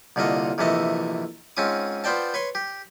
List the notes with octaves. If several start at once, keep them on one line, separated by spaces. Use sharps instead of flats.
C2 A#2 D3 F4 D#5
A#1 C3 E3 A3 D#5 A5
G#2 C4 C#4 F4 D6 D#6
B3 F4 C5 D5 G5 A5
B4 C#5 C6
G4